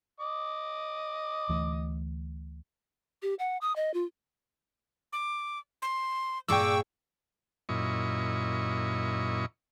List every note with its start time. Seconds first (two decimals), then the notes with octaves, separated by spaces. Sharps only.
0.20 D#5 D6
1.49 D2 E3 A3
3.22 G4
3.39 F#5
3.61 D#6
3.76 D#5
3.94 F4
5.13 D6
5.82 C6
6.48 G2 A#2 G#4 G5 C#6 D6 E6
7.69 F#2 A#2 E4 D#5 C#6